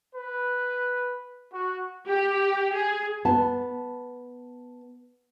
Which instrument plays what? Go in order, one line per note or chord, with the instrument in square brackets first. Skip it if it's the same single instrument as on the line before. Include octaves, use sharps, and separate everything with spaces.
[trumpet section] B4
F#4
[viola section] G4
G#4
[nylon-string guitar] B3 A5